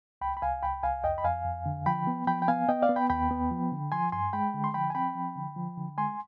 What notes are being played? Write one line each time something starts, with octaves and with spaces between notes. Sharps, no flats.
C2 G5 B5
B5
C2 F5 G#5
C2 G5 B5
C2 F5 G#5
F2 D#5 G5
B5
F2 F5 G#5
F2
D3
F3 G5 B5
B3
F3 G5 B5
G5
B3 F5 G#5
B3 D#5 G5
D5 F5
B3
G5 B5
D#2 G5 B5
B3
F3
D3
F3 G#5 C6
G2 G#5 C6
G#3 G5 B5
D3
C6
F3 G5 B5
G#5
C4 G5 B5
F3
D3
F3
D3
G#3 G#5 C6